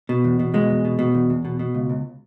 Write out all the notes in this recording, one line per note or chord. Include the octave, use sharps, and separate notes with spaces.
B2
E2
B2
B2 G#3
E2
B2
B2
E2
E2
B2
B2
C#2
C#2